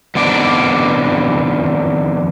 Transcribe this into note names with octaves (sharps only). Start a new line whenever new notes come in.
F2 D#3 B3 D4 D5